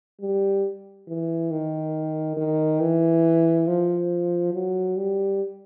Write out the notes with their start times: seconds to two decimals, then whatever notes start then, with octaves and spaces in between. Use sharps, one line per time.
0.21 G3
1.08 E3
1.51 D#3
2.37 D#3
2.80 E3
3.67 F3
4.53 F#3
4.96 G3